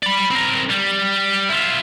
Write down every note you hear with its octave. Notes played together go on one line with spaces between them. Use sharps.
D5 B5
C4 A#4
G3
E4 F4